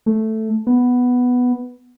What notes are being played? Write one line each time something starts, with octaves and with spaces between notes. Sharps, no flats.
A3
B3